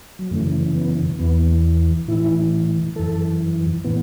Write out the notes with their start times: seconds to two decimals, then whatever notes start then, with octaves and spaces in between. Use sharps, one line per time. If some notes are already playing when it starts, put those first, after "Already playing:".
0.19 F#3
0.31 F#2 C#3 E3 A3
0.75 B3
1.19 E2 E3 B3
2.08 A2 E3 E4
2.96 F#2 E3 A4
3.85 A2 E3 B3